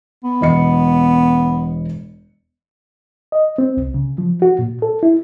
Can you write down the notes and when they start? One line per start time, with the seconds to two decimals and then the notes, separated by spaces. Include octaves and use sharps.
0.24 B3
0.41 E1 D#5 C#7
3.32 D#5
3.58 C4
3.77 C2
3.94 C#3
4.18 F3
4.42 F#4
4.59 A#2
4.82 A4
5.03 E4